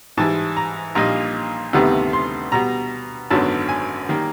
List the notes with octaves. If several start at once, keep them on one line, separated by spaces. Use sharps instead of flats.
G#2 E3 G3 A5
A#5
A#1 A#2 G3 A#3 D#4 A#5
D2 C3 D#3 G3 B3
C6
B2 G3 B3 A#5
G#1 F#2 D3 F#3 B3 A5
G#5
D#3 G3 A#3